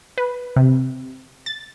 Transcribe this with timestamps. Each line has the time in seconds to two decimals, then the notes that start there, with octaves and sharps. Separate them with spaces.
0.18 B4
0.56 C3
1.46 A6